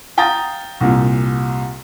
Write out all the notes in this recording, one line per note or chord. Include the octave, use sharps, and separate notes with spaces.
F5 G5 A#5 D#6 A6 A#6
C2 A#2